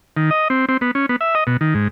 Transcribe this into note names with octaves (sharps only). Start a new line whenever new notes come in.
D#3
D#5
C4
C4
B3
C#4
B3
E5
D#5
B2
D#3
G#2